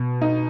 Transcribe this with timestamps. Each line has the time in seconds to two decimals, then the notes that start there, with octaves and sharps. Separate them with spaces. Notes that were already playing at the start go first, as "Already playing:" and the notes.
Already playing: B2
0.21 D#4